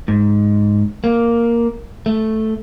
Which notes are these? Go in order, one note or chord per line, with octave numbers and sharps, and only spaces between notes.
G#2
A#3
A3